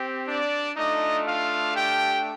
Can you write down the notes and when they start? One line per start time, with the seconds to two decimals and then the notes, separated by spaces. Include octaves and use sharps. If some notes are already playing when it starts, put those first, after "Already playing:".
Already playing: C4 G4
0.28 D4 D5
0.76 A3 D4 D#4 F4 D#5
1.26 F4 F5
1.75 G4 G5